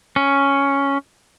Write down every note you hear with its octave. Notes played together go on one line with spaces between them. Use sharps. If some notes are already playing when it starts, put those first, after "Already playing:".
C#4